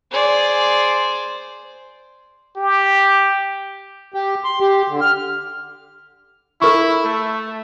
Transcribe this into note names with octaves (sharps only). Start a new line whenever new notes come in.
G#4 C5 D5
G4
G4
C6
G4
D3
F6
E4 A4 A#4 C#6
A3